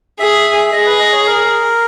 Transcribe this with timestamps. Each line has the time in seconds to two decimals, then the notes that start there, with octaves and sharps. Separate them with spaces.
0.19 G#4 E5
0.72 G#4 D#5
0.86 B4
0.99 D#5
1.13 C#5
1.26 A#4